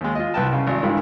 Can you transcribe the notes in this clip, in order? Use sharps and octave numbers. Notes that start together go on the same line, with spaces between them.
D#2 G#3
F4 D#5
C2 B4 G5 A5
C#3
G#1 D5
C#2 G2 D#3 E3 G#3